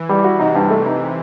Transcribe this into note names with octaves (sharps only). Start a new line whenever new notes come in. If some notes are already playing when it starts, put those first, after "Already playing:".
Already playing: E3
G3
F#4
C3 D#4
G2
A3
D#4